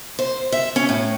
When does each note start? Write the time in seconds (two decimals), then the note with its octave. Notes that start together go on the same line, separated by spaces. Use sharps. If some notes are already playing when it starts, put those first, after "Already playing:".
0.19 C5
0.52 E5
0.76 C#4
0.89 A2